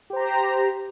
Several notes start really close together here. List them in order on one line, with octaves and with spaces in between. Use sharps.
G4 C5 A#5